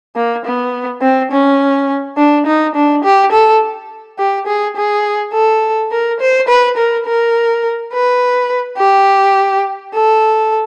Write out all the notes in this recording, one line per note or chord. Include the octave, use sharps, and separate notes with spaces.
A#3
B3
C4
C#4
D4
D#4
D4
G4
A4
G4
G#4
G#4
A4
A#4
C5
B4
A#4
A#4
B4
G4
A4